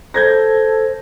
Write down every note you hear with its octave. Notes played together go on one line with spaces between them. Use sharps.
A4 C5 G6 G#6 A#6